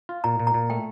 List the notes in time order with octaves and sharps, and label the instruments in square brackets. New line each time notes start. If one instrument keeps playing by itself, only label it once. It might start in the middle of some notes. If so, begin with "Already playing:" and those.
[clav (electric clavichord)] F4
[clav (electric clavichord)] A#2 [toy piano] A#5
[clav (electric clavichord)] A#2
[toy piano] A#5
[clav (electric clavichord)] A#2
[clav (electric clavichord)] A3 [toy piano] G5